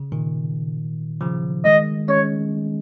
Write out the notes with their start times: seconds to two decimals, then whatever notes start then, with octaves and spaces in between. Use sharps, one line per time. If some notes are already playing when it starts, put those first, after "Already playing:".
Already playing: C#3
0.12 A#2 D#3
1.21 C#3 F3
1.64 D#3 G#3 D#5
2.08 G#3 C#4 C#5